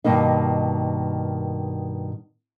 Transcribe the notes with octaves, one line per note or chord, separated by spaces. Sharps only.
G2 B2 D#3 A#3 D#4